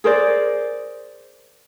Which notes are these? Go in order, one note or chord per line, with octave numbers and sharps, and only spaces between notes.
G#4 A#4 C5 D5